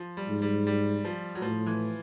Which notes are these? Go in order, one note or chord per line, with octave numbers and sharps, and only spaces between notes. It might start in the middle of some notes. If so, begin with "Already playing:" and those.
Already playing: F3
G3
G#2
G3
G3
F3
F#3
A2 F3
E3